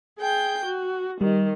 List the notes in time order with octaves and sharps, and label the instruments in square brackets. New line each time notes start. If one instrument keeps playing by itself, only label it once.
[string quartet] G#4 G5 G6
F#4
[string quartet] D#3 [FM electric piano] G3